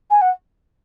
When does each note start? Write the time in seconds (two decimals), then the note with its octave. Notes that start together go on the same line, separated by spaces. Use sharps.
0.10 G#5
0.21 F#5